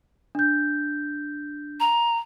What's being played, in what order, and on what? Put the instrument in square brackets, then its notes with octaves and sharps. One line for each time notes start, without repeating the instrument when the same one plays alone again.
[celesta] D4 G6
[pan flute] A#5